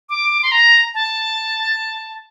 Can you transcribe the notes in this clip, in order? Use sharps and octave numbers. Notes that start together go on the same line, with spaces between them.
D6
C6
A#5
A5